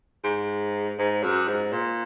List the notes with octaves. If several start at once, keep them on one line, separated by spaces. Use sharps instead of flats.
G#2
G#2
F#2
G#2
A#2